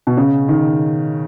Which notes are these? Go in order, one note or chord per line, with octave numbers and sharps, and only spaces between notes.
B2
C#3
D#3